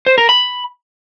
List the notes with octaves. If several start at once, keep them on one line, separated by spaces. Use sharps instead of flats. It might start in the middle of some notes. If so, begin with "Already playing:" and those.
C5
A#4
B5